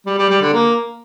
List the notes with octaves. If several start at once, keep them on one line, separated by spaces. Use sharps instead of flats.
G3
G3
G3
D3
A#3